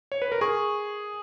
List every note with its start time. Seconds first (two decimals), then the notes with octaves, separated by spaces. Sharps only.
0.12 C#5
0.22 B4
0.32 A#4
0.41 G#4 C#6